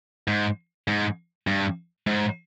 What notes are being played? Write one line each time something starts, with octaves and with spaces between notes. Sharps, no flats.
G#2
G#2
G2
G#2